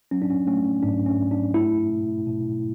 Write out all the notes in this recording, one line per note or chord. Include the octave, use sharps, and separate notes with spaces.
F#3 C#4
D4
C#4
A3 C#4
C#4
G#2 D4
C#4
G#2
D4
A3 E4
B2
B2